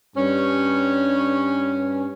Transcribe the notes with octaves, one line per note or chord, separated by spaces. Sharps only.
G2 C#4